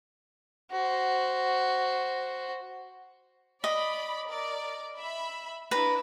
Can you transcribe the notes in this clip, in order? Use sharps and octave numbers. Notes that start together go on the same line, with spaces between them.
F#4 C5
D5 D#5 B5
A#4 D5
E5 B5
D4 E4 B4 A#5